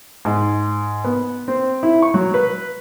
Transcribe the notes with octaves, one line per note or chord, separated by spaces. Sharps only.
G#2
B3
C4
E4
C#6
F#3
B4